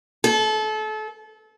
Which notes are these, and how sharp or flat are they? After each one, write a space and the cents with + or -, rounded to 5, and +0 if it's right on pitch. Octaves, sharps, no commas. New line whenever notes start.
A4 -30